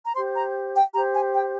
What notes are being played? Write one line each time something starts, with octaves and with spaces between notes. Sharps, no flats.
A#5
G4 C5 C6
A#5
G5
G4 C5 A#5
G#5
G5